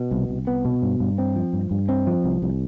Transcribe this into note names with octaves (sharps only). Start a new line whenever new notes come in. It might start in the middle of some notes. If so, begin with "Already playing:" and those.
Already playing: B2
C2
C2
B3
B2
G2
G2
C4
F3
G2
G2
C4
F3
C2
C2